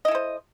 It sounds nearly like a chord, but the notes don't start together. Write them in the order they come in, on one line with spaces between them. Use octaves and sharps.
D#5 E4 A4 C5